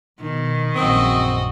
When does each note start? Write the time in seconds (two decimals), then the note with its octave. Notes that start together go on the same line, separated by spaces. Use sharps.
0.21 B2 D#3
0.75 A#1 F#2 C#3 C4 F#4 D#5